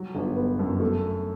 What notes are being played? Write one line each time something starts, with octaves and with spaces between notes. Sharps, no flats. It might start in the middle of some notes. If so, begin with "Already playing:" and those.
Already playing: F#3
G1
B3
F#2
A3